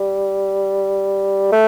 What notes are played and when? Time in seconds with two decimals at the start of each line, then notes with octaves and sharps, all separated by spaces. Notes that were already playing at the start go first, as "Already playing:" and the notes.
Already playing: G3
1.52 A3